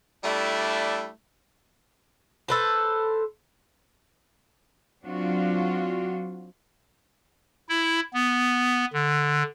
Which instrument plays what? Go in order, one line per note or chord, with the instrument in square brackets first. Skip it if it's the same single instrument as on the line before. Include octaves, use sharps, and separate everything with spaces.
[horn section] G3 A3 D4 E4
[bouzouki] A4 B4 C5
[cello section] F#3 C4 D4 F4 F#4
[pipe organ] E4
B3
D3